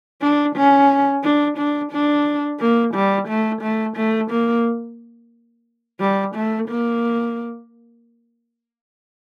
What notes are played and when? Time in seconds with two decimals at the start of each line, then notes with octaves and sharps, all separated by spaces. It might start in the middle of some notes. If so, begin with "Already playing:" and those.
0.22 D4
0.56 C#4
1.24 D4
1.58 D4
1.92 D4
2.60 A#3
2.94 G3
3.28 A3
3.62 A3
3.97 A3
4.31 A#3
6.00 G3
6.36 A3
6.69 A#3